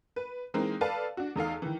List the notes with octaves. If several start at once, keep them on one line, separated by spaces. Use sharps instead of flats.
B4
E3 G#3 A#3 C4 D#4
A4 B4 D5 F5 A5
D4 F#4
E2 D#4 A4 F5
D#3 E3